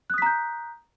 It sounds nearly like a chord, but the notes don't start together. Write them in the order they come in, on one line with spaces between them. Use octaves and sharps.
F#6 D#6 B6 A#5 G6